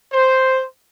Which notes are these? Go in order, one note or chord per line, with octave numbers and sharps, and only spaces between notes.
C5